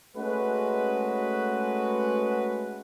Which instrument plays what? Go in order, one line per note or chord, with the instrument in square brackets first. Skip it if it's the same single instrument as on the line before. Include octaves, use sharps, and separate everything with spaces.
[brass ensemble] G#3 A3 C#4 F#4 B4